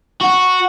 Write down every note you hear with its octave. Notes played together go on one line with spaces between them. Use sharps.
F#4